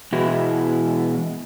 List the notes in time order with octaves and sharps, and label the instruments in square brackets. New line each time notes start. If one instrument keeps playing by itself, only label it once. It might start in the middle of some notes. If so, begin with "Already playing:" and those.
[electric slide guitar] B2 E3 G#3 B3 E4 F#4